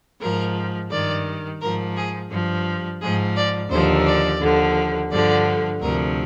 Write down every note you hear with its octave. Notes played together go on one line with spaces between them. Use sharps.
G#2 F3 A#4
G2 D#3 D5
G#2 F3 A#4
G#4
G2 F3
G#2 F3 G#4
D5
D#2 D3 F3 C5
D5
D#2 D3 F3
G2 D3 F3 D5
D2 C3 F3 A#4